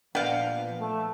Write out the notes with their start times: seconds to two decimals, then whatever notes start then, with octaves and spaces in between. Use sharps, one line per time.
0.15 A#2 F3 B3 D4 F5 G5 A#5
0.79 A3